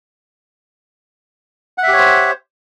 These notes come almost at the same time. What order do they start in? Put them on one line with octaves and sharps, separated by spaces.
F#5 E5 G4 C#5 C5